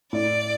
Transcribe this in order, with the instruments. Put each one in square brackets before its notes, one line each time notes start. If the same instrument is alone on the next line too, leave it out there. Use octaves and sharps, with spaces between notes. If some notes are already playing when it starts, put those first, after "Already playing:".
[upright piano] A2 [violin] D5